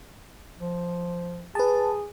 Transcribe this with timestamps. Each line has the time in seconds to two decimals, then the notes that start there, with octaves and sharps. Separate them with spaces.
0.59 F3
1.55 G#4 B4 A5